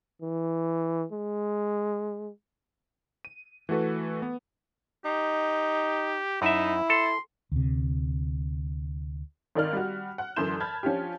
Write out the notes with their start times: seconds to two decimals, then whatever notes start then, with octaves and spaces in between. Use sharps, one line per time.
0.22 E3
1.12 G#3
3.25 D#7
3.69 E3 A3 F#4 A4 B4
4.22 B3
5.05 D#4 G4
6.42 F#2 D#4 E4 E5
6.90 A4 C6
7.52 D2 C3
9.55 G#1 D#3 D5 F6
9.73 G3 F#4
10.18 F#5 F#6
10.36 F#2 D3 E3 C6 G6 E7
10.60 A5 B5 F6 G#6
10.83 F3 C#4 D4 F4 G4